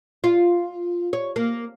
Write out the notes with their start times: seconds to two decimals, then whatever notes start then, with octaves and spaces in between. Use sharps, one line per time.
0.24 F4
1.13 C#5
1.36 A#3